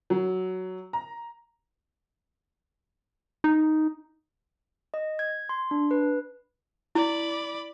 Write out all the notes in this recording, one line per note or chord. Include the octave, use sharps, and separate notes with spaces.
F#3
A#5
D#4
D#5
G#6
C6
D4
B4
E4 D5 B5